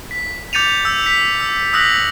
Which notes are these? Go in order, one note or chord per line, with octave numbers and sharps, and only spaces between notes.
B6
D6 G6 A6 C#7 D#7 F7
E6 G6
B6
E6
D#6 E6 F#6 A#6 B6 F#7